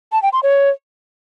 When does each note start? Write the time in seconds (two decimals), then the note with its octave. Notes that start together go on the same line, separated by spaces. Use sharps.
0.12 A5
0.23 G5
0.33 C6
0.43 C#5